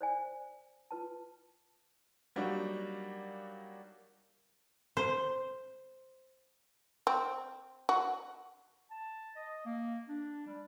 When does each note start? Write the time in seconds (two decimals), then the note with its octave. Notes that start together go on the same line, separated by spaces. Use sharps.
0.01 C5 D5 G#5
0.91 F4 B4 A5
2.36 F#3 G3 A#3 D4 D#4 F#4
4.97 C5
7.07 C4
7.89 F#4
8.90 A5
9.36 D#5
9.66 A#3
10.09 D4
10.47 G3